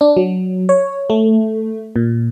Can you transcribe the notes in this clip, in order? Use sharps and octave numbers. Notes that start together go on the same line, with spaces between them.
D4
F#3
C#5
A3
A#2